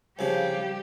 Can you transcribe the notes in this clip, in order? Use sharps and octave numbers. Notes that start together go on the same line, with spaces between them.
C2 C#3 F3 G3 G4